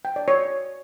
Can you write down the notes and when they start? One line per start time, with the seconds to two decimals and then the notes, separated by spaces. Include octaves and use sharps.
0.05 G5
0.16 D5
0.28 C#5